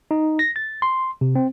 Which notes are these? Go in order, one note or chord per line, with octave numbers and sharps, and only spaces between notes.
D#4
A#6
A6
C6
C3
C4